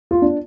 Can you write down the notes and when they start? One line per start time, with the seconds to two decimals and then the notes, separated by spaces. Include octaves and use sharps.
0.11 F4
0.22 D4